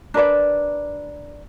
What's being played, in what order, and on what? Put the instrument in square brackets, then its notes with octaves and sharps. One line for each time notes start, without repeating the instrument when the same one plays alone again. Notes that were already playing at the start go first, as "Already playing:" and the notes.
[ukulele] D4 A#4 B4 D5